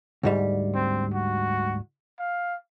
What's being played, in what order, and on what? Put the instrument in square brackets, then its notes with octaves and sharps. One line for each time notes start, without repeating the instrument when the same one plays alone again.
[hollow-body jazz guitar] D2 G#2 G3
[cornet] C4
F#4
F5